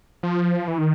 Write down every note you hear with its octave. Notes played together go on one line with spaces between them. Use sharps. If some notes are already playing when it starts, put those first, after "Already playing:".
F3
E3
D#3